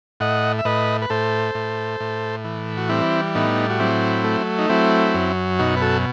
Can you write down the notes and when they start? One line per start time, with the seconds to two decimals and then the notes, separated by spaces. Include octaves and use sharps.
0.20 A2 D#5 F#5
0.59 E5
0.65 A2 B4 D#5
1.02 B4
1.10 A2 A4 C5
1.55 A2
2.00 A2
2.44 E3
2.77 F#4
2.89 G3 C4 E4
3.35 A2 B3 D#4
3.70 F#4
3.79 F#3 C4 E4
4.24 A3
4.58 D#4
4.69 F#3 C4 E4
5.15 F#2
5.59 B2 D#4 F#4
5.77 B4
5.82 F#4 A4